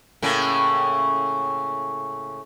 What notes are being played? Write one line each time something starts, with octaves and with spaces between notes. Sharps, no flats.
A2 C#3 A#3